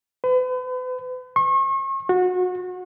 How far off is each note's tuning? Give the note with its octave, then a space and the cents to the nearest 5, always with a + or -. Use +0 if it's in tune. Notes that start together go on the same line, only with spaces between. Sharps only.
B4 +40
C#6 -40
F#4 -25